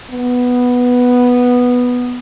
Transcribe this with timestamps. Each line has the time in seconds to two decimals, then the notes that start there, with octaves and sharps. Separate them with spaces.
0.10 B3